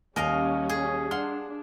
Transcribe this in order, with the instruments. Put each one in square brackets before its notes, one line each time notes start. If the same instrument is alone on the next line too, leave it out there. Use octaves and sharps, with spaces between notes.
[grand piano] D#2 G#5 [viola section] G3 C#4 [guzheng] A#4 D#5 F5
[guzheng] G#4
[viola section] D4 [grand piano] F#5 F6 [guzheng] C6